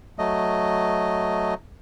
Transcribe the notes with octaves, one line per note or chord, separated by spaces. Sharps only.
F#3 A3 D#5